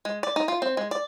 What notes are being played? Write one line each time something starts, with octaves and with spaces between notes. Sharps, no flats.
G#3
D5
D#4
F4
C4
G#3
D5